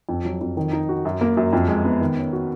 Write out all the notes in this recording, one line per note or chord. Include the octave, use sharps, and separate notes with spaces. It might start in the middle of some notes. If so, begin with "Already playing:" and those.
F2
F#3
F2
D#3
D#4
F#4
F#2
A#3
F#2
F2
G#3
B3
D#3
C#4
F#4